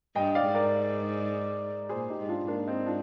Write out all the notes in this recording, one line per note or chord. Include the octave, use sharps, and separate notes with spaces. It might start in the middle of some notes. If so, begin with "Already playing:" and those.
G2 D#5 G5
D5 F5
G#2
A#4 D5
A#2 G#4 C5
D#4 G4
G#2
D4 F4
G#2 A#3 D4
C4 D#4
D4 F4